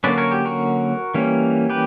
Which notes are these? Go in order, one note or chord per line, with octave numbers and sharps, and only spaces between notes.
D3 F#3 A#3 C#4 B4 D5
A#4 C#5
G4
F#4 A#4
E3 G3 A#3 C#4
G4 B4